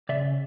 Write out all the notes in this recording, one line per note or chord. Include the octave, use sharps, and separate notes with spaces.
C#3 D5 E5